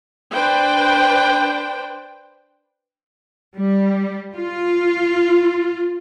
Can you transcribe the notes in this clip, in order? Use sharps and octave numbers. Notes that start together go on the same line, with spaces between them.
D4 B4 C5 G5
G3
F4